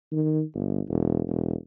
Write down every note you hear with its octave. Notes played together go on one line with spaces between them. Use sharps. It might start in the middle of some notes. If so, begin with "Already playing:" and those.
D#3
G1
E1
E1